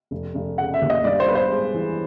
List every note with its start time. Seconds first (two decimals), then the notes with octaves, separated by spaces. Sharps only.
0.11 F1
0.35 F1
0.58 C#3 F#5
0.74 E5
0.82 D#2
0.90 D#5
1.04 G2 D5
1.20 C5
1.27 B3 B4
1.35 C5
1.51 G#3
1.74 E3